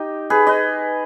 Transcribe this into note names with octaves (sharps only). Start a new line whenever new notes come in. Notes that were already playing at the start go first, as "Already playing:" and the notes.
Already playing: D#4 G4
G#4 B4
B4 D#5